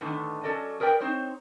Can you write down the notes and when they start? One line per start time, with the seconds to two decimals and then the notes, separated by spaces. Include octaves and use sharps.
0.01 A2 D3 D#3 B3
0.43 F#3 C#4 A4 D5 D#5
0.80 G#4 A#4 B4 D5 G5
1.00 C4 D#4 C5 C#5